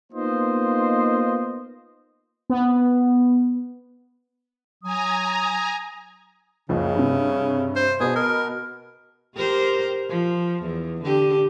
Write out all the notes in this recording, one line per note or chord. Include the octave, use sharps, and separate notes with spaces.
A#3 B3 D#4 F4 C5 D#5
B3
F#3 G#5 A#5 D#6
F#1 C#2 C#3 F3
G2 C3
C5
B2 B3 G#4
A#4
G4 A#4 C5
F3
E2
D3 G4